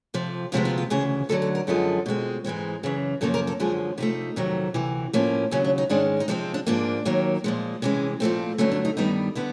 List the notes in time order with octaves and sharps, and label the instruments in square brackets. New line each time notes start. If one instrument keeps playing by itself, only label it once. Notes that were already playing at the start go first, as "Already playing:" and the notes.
[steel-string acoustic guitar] F2 C3 F3
D2 C3 F3 G#3 B3 F4
F4
F4
D2 C#3 E3 G#4
D2 D3 F#3 A4
A4
A#4
F#2 D3 F3 G#3 B3 A4
B2 G#3 C4
G#2 E3 G#3 C4
F#2 C#3 E3 G#4
F#2 C#3 F3 A#3 A4
A#4
A4
F#2 D3 F3 G#3 G#4
C3 F3 A3 D#4
F2 C3 D#3 F#3
D2 C3 E3
A2 F3 A#3 C#4
D#2 C#3 F#3 C#4
D4
D#4
G#2 D#3 G#3 C#4 D4
D#4
C3 F3 G#3 C4 D4
D4
G#2 F3 A#3 D4
D#2 D#3 F#3 A#3
A#2 F3 G#3
C3 E3 G#3 C#4
A#2 F3 A3 C4
G2 D3 F#3 A3 C#4
D4
D#4
G2 D#3 G3 B3 D#4
D3 G3 B3 E4